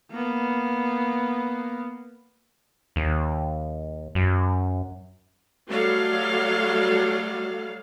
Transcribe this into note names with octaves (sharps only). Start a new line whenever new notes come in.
A#3 B3
D#2
F#2
F#3 G3 A3 A4 F5